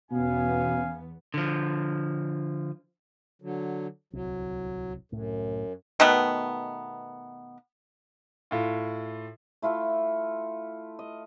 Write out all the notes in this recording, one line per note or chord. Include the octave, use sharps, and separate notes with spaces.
E2 B2 B3 C#4 F5 G#5
D3 F3
D3 F#3
D1 C2 F#3
C2 F#2 A2
B2 D#3 A3 B3
A2 F4
A3 E4 F4 A4
D#5